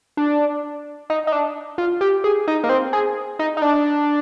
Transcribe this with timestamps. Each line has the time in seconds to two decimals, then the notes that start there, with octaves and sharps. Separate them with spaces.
0.17 D4
1.10 D#4
1.27 D#4
1.32 D4
1.78 F4
2.01 G4
2.24 G#4
2.48 D#4
2.64 A#3
2.69 C4
2.93 G#4
3.39 D#4
3.57 D#4
3.62 D4